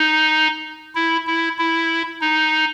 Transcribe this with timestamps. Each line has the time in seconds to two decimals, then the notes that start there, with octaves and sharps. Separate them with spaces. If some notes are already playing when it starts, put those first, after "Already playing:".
Already playing: D#4
0.95 E4
1.27 E4
1.58 E4
2.21 D#4